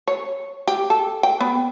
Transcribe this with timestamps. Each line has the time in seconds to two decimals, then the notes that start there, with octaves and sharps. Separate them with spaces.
0.07 C#5
0.67 G4
0.90 A4
1.23 G5
1.41 B3